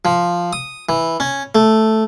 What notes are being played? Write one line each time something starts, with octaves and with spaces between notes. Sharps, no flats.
F3
D#6
E3
C#4
A3